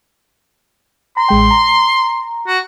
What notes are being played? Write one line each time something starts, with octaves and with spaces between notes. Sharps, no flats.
A#5 C6
A1 G#3 G5
A#5
F#4